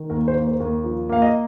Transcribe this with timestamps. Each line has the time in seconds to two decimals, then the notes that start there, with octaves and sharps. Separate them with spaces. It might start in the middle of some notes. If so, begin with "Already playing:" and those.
Already playing: D#3
0.10 D#2 A#4
0.28 C5
0.35 A#3
0.47 C5
0.60 D#2
0.84 F3
1.09 A#3 F5
1.22 D#5